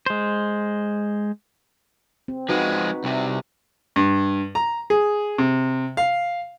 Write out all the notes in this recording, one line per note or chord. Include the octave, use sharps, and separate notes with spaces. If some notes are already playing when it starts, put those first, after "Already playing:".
G#3 C5
C4
F3 G#3 D#4 F#4 B4
C2 C3
G2
A#5
G#4
C3
F5